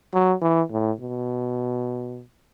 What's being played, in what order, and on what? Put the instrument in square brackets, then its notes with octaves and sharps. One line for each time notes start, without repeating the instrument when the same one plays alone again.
[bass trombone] F#3
E3
A2
B2